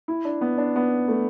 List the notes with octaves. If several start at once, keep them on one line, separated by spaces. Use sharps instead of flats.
E4
D4
B3
D4
B3
A3